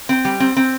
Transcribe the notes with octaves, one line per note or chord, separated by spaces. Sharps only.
C4
G3
C4
C4